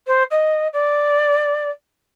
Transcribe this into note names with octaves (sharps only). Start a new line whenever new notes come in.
C5
D#5
D5